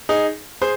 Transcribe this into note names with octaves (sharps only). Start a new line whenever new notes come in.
D#4 G#4
G#4 C5